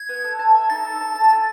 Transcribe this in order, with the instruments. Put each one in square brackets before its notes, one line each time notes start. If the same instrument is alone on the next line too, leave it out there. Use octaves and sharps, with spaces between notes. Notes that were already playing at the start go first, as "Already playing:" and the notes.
Already playing: [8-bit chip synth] G#6
[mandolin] B3
A4
A5
E5
[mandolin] D#4 [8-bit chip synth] A6
[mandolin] A4
A5
A4
G#5